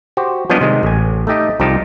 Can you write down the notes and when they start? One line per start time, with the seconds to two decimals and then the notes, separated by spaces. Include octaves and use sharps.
0.17 F#4 G4 C5
0.50 F3 G3 B3 C#4 D4 D#5
0.61 C3 D#3 G#3
0.83 A1 G#5
1.27 A3 D#4 G4 D#5 G5
1.60 C2 F3 D#4 G4 A5